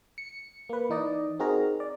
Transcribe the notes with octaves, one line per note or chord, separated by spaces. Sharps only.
C#7
A#3 B4
E3 D#4 D5 D#5
C4 D#4 F#4 G#4 A#4 A#5
D5